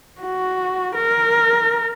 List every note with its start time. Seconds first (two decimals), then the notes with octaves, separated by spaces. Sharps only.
0.21 F#4
0.95 A#4